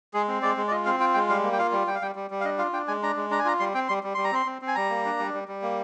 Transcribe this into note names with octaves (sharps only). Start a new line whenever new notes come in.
G#3 G#4
C4
G#3 D5
G#3
D5
F4 D#5
C4 F5
F4 G5
G#3 G5
G3 F5
A#3
G5
F4 F5
G3
G3 G5
F5
G3 G5
G3
G3
F5
D4 D#5
F4 F5
D4 G5
G#3 G#5
D4 A#5
G#3
D4 A#5
G#5
F4 A#5
G3 C6
C4 G5
G3 C6
G3
G3 C6
A#5
C4 C6
C4
C4
G#5
G3 A#5
A#3
D4
G3
G3
G3
A#3